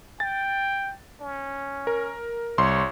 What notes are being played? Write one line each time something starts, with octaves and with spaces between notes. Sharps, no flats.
G5 A6
C#4
A#4
C2 C#5 C6